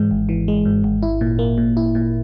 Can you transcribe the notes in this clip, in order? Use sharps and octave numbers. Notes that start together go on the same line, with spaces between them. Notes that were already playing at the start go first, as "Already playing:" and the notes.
Already playing: G#2 E3 G#3
G#1
E3
G#3
G#2
G#1
E4
A#2
A#3
A#2
E4
A#2